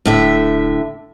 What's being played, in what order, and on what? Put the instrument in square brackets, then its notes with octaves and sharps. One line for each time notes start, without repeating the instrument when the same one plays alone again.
[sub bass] D#1 [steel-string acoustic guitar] A2 D3 E5